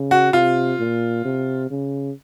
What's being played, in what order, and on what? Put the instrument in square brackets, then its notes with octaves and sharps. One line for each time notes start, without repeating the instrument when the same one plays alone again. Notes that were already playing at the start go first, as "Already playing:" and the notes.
Already playing: [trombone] C#3
[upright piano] F#4
[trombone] C3 [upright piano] F4
[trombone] A#2
C3
C#3